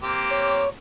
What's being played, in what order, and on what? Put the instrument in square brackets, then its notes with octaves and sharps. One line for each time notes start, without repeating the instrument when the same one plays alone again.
[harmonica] A#3 C4 G4
[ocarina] C#5